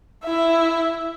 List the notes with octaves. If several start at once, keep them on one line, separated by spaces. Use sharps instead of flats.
E4 E5